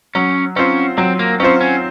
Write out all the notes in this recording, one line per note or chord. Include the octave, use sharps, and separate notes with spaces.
F#3 C#4
C4 C#4 F4 C5
F#3 C4
A#3
C4 C#4 F4 C5
C#4